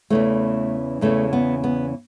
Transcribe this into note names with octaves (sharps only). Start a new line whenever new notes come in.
E2 C#3 E3 A3
E2 C#3 E3 A3
B3
B3